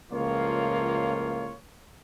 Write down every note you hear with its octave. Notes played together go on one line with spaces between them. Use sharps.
C#2 A2 F3 A#3 F4 C#5